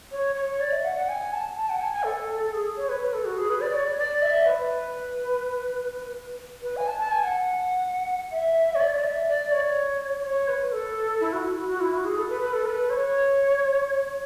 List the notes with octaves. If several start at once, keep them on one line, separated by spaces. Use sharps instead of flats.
C#5
C#5
D5
E5
F#5
F#5
G#5
A5
A5
F#5
G#5
G#5
A4
A4
G#4
C#5
B4
B4
A4
F#4
G#4
B4
D5
C#5
D5
D5
E5
B4
B4
G#5
A5
A5
G#5
F#5
E5
C#5
D5
D5
E5
D5
C#5
C#5
B4
A4
E4
F#4
F#4
F#4
E4
F#4
G#4
A4
B4
B4
A4
B4
C#5
C#5